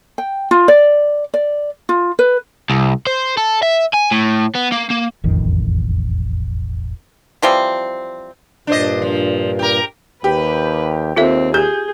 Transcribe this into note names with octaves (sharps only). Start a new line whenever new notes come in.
G5
F4
D5
D5
F4
B4
C2
C5
A4
E5
G#5
A2
B3
A#3
A#3
E1 A1 F2 D#3
E3 F3 G3 C4
G2 A#2 D4 C5 D#5
F3
G4 A#4
D#2 G4 B4
D#2 C4 F4 A4 E5
G4 G#4 G6